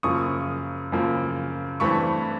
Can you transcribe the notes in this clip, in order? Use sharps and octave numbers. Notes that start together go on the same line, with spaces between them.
F#2 C#3 F3 A#3 C#6 D#6
F#2 C#3 F3 A#3
G2 E3 A3 C4 B5 C#6